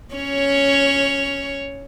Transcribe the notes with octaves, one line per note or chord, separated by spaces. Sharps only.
C#4 C#5